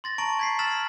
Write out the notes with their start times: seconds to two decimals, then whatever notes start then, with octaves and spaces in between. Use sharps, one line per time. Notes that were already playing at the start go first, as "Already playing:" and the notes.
0.04 C6 A6 A#6
0.18 A5 A#5 C#6 D7 F#7
0.39 G#6 B6 C7
0.59 E6 F6 A6 B6 E7 F#7